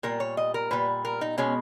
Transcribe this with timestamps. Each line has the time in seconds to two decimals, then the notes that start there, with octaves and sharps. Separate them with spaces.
0.03 A#2 G3 A#4
0.20 C#5
0.37 D#5
0.54 A#4
0.71 A#2 G3 B4
1.05 A#4
1.21 D#4
1.38 B2 G#3 C#4